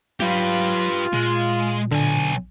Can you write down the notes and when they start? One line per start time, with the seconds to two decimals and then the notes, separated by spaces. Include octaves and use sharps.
0.20 F#3 F4 G4 B4
1.13 A#2 G#3
1.91 B1 D3 G#5